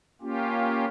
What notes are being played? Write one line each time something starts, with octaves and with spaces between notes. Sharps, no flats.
A#3 C#4 F4 G4